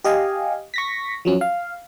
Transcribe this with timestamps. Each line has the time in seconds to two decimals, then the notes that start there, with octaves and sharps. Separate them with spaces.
0.04 G4 D#5 F5 G#5
0.74 C#6 A#6 B6
1.25 F3 F#3 C#4
1.41 F5